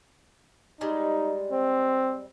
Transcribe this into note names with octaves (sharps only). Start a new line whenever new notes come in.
G3 G#3 D#4
C4